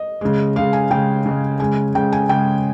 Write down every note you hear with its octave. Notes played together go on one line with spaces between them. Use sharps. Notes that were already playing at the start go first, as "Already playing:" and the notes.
Already playing: D#5
C#3 G#3
C#3 G#3 F5
G#5
C#3 G#3 G5
C#3 G#3
C#3 G#3 G#5
C#3 G#3 G5
G#5
C#3 G#3 G5